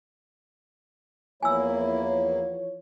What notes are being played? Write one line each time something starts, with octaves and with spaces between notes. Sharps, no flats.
E2 E3 F3 A#3 E4 C#5 G#5 E6